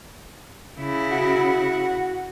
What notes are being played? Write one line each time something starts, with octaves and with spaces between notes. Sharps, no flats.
C#3 E4
F#4